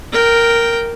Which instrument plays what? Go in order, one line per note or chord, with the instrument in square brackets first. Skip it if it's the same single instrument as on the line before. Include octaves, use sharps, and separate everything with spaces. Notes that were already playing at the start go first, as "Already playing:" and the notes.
[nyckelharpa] A#4 G5